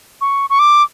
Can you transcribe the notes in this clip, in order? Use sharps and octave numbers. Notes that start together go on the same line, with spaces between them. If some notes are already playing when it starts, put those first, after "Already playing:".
C#6
C#6
D6